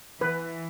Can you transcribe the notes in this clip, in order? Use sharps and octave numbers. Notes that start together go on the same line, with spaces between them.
E3 B4